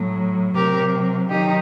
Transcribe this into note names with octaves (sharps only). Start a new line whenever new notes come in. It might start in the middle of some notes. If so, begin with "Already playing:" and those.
Already playing: A2 F#3
C3 F#3 G4 A#4
D#3 F#3 D#4 G4